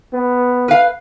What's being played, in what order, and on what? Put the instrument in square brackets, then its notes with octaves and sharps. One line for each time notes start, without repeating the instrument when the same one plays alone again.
[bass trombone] B3
[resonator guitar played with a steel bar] B4 F5